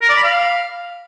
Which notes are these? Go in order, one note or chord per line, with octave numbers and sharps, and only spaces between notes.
A#4
D5
B5
F5